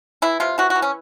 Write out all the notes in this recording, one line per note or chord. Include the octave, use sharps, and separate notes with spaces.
E3 E4
C3 F4
E3 F#4
F#4
E3
C#4